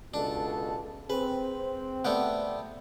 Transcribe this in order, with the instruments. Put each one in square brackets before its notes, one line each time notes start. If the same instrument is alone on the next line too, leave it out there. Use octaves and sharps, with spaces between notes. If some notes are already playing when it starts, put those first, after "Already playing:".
[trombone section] C#2 B2 A4 [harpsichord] D4
[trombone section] C4 [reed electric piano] G#4 [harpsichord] B4
[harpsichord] A3 B3 G4 [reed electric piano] D5 F#5